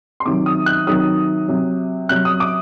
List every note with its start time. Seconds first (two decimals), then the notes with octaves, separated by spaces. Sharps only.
0.20 C6
0.26 C3 D#3 F#3 D6
0.46 D#6
0.66 F#6
0.87 C3 D#3 F#3 D#6
1.48 C3 F#3
2.09 C3 F#3 F#6
2.25 D#6
2.40 D6